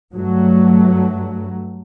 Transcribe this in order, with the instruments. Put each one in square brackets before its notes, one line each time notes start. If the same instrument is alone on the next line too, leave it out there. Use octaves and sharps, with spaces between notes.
[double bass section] G2 F#3 A3